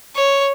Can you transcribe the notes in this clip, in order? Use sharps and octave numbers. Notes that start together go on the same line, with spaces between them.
C#5